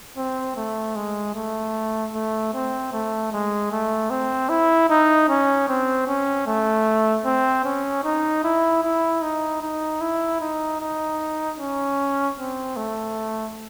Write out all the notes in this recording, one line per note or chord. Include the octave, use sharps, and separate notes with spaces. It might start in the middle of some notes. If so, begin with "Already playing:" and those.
C4
A3
G#3
A3
A3
C4
A3
G#3
A3
C4
E4
D#4
C#4
C4
C#4
A3
C4
C#4
D#4
E4
E4
D#4
D#4
E4
D#4
D#4
C#4
C4
A3